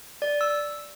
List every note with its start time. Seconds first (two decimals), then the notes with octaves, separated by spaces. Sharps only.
0.22 D5
0.41 E6